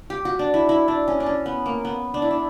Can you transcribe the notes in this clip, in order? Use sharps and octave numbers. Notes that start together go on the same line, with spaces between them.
G4
F#4
D4
E4
E4
D4
C#4
D4
C#4
B3
A#3
B3
D4
E4
D4